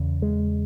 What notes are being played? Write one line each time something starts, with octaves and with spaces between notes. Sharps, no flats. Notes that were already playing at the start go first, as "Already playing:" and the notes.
Already playing: E2 C#3
G#3